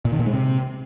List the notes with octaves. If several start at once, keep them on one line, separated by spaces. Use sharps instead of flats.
A#2
D#3
A#2
G#3
C3